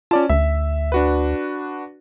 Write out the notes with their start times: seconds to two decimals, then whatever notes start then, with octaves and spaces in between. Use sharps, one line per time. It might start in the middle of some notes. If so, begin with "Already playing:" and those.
0.11 C#4 F4 D5 A5
0.29 D2 E5
0.92 D4 F#4 B4